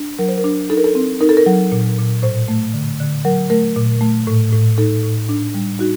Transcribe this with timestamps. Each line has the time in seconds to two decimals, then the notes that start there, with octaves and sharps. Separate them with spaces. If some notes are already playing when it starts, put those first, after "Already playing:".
Already playing: D4
0.19 F#3 A#4
0.28 C5
0.38 A#4
0.44 D4
0.70 D#4 A4
0.77 A#4
0.84 A4
0.95 C4
1.21 D#4 A#4
1.29 A4
1.37 A#4
1.46 F#3
1.72 A#2
1.98 A#2
2.22 A2 C5
2.48 A3
2.73 D3
3.00 D3
3.25 F#3 A#4
3.50 A3 A#4
3.76 A#2
4.01 A3
4.27 A2
4.52 A2
4.78 D#4 A4
5.03 A2
5.29 D4
5.54 G3
5.79 D#4 F#4